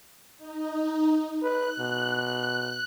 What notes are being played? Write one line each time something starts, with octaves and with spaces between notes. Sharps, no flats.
D#4
B4 F#6
B2